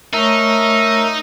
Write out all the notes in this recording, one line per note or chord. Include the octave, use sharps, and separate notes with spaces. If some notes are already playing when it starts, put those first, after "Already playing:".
A3 D#4 A#4 C#5 E5 C#6